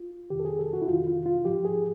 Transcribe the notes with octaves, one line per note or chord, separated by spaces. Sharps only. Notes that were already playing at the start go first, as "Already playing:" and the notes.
Already playing: F4
F2 C3 D#3 G4
A4
G#4
A4
F#4
E4
F2 C3 D#3 F4
F4
F4
G#2 F3 G4
G#4